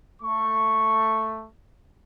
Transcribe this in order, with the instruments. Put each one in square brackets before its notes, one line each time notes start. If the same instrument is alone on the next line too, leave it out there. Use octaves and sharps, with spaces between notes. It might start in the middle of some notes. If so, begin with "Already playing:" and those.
[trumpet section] A3 C#6